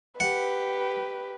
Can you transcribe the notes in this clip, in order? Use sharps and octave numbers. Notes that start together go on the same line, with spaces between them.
G4 B4 F#5